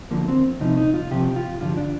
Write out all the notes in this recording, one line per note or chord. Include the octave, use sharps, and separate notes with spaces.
D2 D3 F3 A#3
C4
C2 C3 F3 D#4
D#4
F4
C2 C3 F3 G4
F4
G2 D3 F3 F4
D4